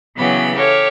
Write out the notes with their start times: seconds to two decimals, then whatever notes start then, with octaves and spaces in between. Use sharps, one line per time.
0.17 C#3 E3 F#3 B3 G4 B5
0.56 G4 A4 C#5 F5